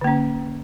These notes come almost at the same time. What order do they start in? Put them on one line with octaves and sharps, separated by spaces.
D3 A#3 C#4